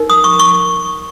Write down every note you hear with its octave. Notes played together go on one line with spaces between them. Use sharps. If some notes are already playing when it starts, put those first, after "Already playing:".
Already playing: D#4 A#4
D#6
C#6
C#6